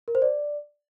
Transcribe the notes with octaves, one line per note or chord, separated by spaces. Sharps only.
A#4
C5
D5